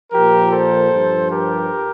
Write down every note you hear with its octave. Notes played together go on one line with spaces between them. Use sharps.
A#2 F3 G4 A#4
A4 C5
G2 F3
G4 A#4